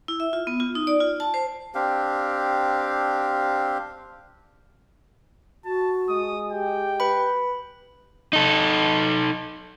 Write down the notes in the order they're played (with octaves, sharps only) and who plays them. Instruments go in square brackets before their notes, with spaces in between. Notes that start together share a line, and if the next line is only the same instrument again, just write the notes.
[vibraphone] E4
E5
F4
B3
F4
D#4
D5
F4
A5
C5
[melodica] C4 D4 G4 F5
[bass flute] F#4 [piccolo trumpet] A5
[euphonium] G#3 [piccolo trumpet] D#6
[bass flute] G4 [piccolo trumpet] G5
[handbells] B4 B5
[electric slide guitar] D#4 A4